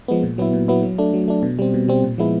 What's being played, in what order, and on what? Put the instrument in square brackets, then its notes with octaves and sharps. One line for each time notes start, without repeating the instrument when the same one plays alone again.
[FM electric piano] F3 G#3 B3
A#2
F#3 B3 E4
A#2
F#3 B3 E4
F#3
A3 D4
F#3
A3 D4
B2
G3 C4
B2
G3 C4
A#2
F3 G#3 B3 E4